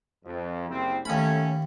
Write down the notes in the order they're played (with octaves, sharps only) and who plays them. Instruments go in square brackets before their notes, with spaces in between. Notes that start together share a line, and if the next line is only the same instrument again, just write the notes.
[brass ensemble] F2
F#1 C2 C4
[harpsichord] D#2 B5 [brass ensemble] A3 C#4